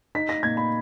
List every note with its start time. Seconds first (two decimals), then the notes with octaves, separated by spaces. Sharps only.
0.15 D#4 B6
0.29 A#6
0.43 A#2 G#6
0.57 B5